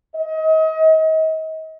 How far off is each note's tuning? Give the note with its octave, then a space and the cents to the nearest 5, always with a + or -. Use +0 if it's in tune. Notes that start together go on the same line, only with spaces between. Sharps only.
D#5 +35